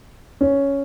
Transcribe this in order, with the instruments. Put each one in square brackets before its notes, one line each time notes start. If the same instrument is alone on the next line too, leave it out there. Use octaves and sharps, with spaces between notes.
[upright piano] C#4